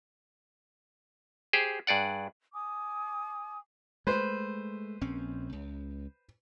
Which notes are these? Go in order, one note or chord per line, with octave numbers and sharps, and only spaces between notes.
G4 G#4 C5
G2 G#4 D5 F#5
G#5 D6 D#6
G#3 A3 B4 C5
A#1 C4 C#4
C#2